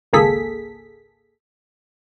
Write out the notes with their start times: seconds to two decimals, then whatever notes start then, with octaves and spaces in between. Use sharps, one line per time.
0.13 G#1 C#2 A#3 G#4 A4 B6